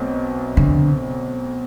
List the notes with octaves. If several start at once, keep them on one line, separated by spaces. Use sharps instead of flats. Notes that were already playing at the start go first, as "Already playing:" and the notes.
Already playing: B1 B2 A3 C4
D3